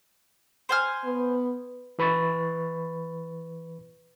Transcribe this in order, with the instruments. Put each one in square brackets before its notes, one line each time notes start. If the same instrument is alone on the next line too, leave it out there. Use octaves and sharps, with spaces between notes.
[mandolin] C5 G#5 F6
[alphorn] B3
[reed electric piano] E3 B4 B5 C#6 A6